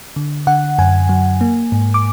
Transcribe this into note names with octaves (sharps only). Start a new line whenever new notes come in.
D3
D3 F#5
F#2 G#5
F#3
A#3
G#2
D6